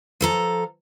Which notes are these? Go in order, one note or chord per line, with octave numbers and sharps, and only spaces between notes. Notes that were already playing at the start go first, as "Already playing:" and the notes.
F3 A4 A#5